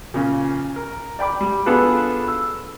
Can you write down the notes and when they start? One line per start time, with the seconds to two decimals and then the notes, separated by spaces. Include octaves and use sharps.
0.14 A#2 C#3
0.76 A#4
1.19 D5 G5 B5 D6
1.41 G3
1.66 B3 D4 F4 G#4 A4 B4
2.28 E6